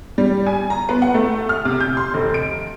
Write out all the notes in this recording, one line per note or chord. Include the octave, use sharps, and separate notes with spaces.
G3
G#5
A#5
B3
F#5
A3
F6
C3
G6
C6
F1
D7